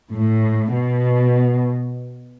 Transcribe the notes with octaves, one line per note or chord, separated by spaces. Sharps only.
A2
B2